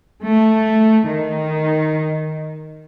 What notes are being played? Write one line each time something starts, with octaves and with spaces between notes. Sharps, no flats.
A3
D#3